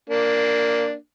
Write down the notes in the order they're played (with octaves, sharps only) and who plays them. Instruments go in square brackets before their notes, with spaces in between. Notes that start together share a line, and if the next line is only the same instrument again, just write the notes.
[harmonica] A#3 D4